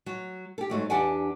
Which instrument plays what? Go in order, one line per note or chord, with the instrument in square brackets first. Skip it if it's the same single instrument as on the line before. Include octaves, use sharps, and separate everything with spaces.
[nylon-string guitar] F#3
G4 A4
G#2 F#3 A3
E2 D4 G4 F#5 G#5